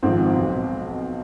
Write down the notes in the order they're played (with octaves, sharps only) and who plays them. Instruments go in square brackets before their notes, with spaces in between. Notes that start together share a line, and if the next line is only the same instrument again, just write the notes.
[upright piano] G#1 G#2 F3 C4
B1 B2